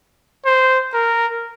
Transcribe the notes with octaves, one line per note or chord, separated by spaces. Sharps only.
C5
A#4